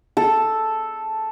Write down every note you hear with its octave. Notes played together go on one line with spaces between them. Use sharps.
A4